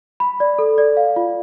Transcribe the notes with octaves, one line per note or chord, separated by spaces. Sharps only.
B5
D5
A4
D5
F5
F4